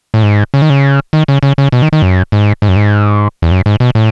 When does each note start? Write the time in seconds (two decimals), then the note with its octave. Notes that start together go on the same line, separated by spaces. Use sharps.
0.14 A2
0.23 G#2
0.54 C#3
0.62 D#3
0.70 C#3
1.13 D#3
1.28 C#3
1.43 C#3
1.58 C#3
1.72 B2
1.82 D#3
1.93 D#3
2.02 F#2
2.32 G#2
2.62 G#2
2.68 F#2
2.76 G#2
3.42 E2
3.51 F#2
3.66 G#2
3.80 B2
3.95 A2